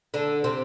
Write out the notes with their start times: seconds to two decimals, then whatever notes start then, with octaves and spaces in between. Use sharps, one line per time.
0.14 D3 D4
0.44 C3 C4